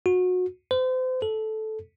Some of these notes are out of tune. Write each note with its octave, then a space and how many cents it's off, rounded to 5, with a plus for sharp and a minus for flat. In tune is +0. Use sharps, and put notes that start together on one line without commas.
F#4 -25
C5 -35
A4 -10